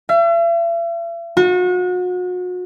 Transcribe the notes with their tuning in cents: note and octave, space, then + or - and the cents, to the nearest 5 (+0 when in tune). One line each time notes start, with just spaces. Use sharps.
E5 +45
F#4 -35